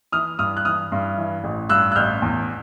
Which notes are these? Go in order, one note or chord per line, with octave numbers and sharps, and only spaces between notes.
E3 D#6 F6
G2 D#6 F6
F#6
E3 D#6 F6
G2
E3
A1
G2 E6 F#6
F#6
A1 F6 G6
E2